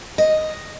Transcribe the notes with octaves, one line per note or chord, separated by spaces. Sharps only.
D#5